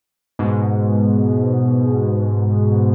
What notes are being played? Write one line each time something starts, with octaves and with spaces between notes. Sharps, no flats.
G#2 B2